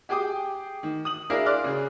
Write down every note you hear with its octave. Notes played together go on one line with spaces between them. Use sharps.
G4 G#4 G5 D6 D#6
D#3
D#6 F#7
D4 E4 G#4 A#4 F5
D5 C6 F6 F#6
C#3 G#4